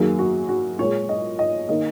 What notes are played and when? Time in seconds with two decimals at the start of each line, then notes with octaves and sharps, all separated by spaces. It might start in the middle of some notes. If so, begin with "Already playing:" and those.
Already playing: F#2 D#3 F#3 A#3 G#4
0.19 F#4
0.49 F#4
0.79 A#2 G#3 C#5
1.09 D#5
1.39 D#5
1.69 D#3 A#3 D#5